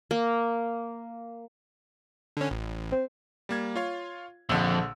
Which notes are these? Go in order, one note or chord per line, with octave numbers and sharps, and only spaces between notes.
A#3
D3 C#4
A1
C4
G3 A#3 G#6
F4 C#5 F5
A#1 F2 D3 E6